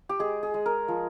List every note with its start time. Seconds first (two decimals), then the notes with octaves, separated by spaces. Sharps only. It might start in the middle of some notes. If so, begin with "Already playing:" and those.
0.09 G4
0.19 G#3 G#4
0.43 G#4
0.54 G#3
0.66 A#4
0.88 F3